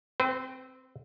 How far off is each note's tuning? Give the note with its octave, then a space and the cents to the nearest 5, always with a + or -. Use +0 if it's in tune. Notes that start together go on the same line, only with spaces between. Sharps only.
C4 +0 C5 -45